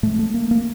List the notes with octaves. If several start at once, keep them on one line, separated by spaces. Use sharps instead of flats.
A2 A3
A3
A#3
A#3